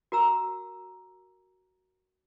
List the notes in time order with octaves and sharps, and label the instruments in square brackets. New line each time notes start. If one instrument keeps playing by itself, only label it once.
[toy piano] F#4 A#4 A#5 E6